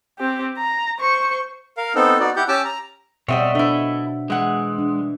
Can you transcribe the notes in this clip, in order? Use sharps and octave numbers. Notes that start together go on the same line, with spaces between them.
C4 G4
A#5
C5 C#6
A#4 F5
B3 C4 D#4 A4
B3 D#4 F#4 D5
E4 G4 F#5 G6
C#4 G4 A5 D6 E6
A#5
B2 G3 A3 C4 C#5 D#5 E5 F#5
A3 D4 E4 C5
E3 G#3 F#5
D4